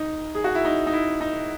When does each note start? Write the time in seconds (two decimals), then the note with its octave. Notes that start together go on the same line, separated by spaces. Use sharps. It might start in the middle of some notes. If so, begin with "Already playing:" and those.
Already playing: D#4
0.35 G#4
0.44 F#4
0.55 E4
0.65 D#4
0.87 D#4
0.93 E4
1.21 D#4